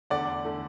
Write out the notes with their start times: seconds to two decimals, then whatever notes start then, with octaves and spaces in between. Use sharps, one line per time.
0.10 E2 D3 A3 D5 F#5
0.45 D3 A3